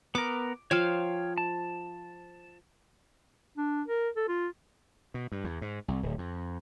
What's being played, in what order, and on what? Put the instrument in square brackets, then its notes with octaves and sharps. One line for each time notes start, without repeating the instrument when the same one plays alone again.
[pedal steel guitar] B3 A#4 [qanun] D6
[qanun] F3 F5 [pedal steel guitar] C#5 G5 F6
[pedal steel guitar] A5
[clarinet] D4
A#4
A4
F4
[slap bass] B2
G2
E2
G#2
C2
D1
F2